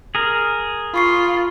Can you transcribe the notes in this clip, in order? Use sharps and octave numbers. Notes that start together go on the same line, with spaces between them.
G#4 A#4
F4 B5 C#6 C7